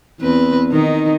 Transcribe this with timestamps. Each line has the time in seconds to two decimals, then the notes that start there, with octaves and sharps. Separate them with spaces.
0.20 E2 C4 B4
0.72 D#3 D#4